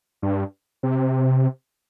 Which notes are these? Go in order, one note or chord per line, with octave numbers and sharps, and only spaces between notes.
G2
C3